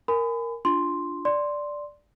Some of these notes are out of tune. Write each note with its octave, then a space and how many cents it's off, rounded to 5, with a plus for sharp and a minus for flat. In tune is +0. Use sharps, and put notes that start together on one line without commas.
A#4 +0 G#5 +0 B5 +35
D4 +0 F4 +0 C6 +0
D5 +0 C6 +0